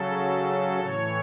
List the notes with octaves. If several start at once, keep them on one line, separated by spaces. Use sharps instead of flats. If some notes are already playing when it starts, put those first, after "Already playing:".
Already playing: C#3 F#3 A4
A2 E3 C#5